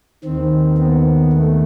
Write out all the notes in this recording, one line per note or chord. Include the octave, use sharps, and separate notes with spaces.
D#2 D#3 C4
B3
A3